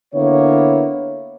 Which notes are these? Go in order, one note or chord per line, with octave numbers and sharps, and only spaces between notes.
D3 A#3 B3 E4 C#5